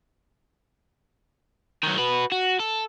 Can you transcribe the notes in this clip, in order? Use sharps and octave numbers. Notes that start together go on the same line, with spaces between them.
D#3 F#3
F#4 B4
F#4
A4